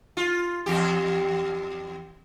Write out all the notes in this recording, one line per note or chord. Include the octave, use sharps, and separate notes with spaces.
F4
E2 G4